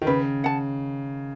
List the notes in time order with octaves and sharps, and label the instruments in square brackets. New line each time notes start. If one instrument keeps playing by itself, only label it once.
[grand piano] D#3
[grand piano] C#3 [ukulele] B4
[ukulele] F#5 A5